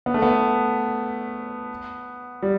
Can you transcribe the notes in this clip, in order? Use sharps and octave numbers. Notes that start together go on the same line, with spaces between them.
B3
A3
B3
G3